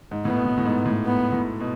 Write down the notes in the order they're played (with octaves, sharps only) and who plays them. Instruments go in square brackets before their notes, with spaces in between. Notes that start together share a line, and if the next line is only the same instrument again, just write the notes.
[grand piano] G#2
[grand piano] A2 [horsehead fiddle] B3
[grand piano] B2
A2
A2
G#2
A2
[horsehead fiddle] B3
[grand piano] A2
B2